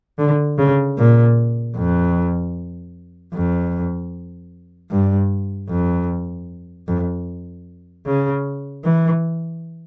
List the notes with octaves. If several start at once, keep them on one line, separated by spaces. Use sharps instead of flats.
D3
C#3
A#2
F2
F2
G2
F2
F2
C#3
E3